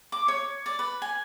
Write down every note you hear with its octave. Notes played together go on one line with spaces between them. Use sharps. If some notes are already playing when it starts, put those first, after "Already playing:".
D6
C#5
D5
B4
G#5